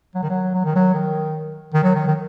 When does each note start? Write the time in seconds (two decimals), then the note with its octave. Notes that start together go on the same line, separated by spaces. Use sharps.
0.15 F#3
0.23 D#3
0.30 F#3
0.54 F#3
0.65 D#3
0.76 F#3
0.94 D#3
1.74 D#3
1.84 F#3
1.95 D#3
2.07 D#3